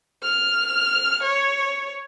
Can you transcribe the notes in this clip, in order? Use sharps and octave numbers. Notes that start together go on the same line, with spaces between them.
F6
C#5